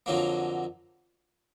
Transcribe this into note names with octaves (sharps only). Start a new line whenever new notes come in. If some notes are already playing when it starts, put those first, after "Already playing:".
F2 D3 F#3 A#3